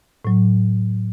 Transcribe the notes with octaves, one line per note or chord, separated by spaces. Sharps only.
A2 F#3